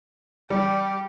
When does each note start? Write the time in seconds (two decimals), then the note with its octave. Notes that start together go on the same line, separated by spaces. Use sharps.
0.50 G3 G4